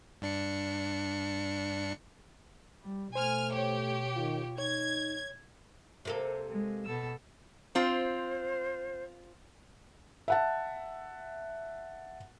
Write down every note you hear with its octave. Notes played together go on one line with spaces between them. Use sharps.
G2 D4 C#7
G3
B2 A3 C5 G#5 F6
G4 C#5
D#3 F4
D#4 C#5 G#6
C3 A#3 A4
G#3
B2 A4 E6
C4 F4 C5
E5 F#5 A5